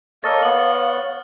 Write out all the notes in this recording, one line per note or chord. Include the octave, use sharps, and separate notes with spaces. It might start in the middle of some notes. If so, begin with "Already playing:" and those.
A#3 A4 C#5 D#5 F5 F6 A6
B3 F#7